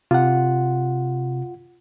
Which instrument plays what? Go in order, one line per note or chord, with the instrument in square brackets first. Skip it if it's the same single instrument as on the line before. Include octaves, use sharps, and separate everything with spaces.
[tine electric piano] C3 [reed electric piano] F4 F#5